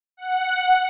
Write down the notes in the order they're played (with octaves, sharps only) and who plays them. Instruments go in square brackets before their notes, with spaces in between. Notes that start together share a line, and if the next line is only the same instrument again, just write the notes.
[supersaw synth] F#5